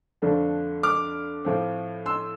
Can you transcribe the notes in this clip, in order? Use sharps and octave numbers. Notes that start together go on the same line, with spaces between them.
F2 D3 F3 A3 D4
D6 F6
A2 F3 C4
C6 E6